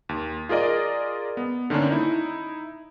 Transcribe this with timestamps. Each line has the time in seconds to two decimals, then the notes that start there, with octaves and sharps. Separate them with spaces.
0.09 D#2
0.49 F4 G#4 A#4 D5 D#5
1.37 B3
1.70 D3 D#3 A#3 C#4 D4
1.90 D#4 E4